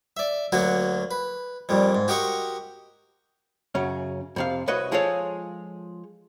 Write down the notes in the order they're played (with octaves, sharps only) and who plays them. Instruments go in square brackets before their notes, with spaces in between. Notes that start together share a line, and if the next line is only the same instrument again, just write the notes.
[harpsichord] D5 E5
D2 F#3 A#3 F#4 F#5
B4
F2 A#2 G3
G#2
F#4 G4 A#4 D#5 C6 C#6
[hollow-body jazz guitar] F#2 C#3 C#4
F2 C3 F5
C2 F#4 B4 C#5 D#5
F3 G#3 F4 G#4 A4 C#5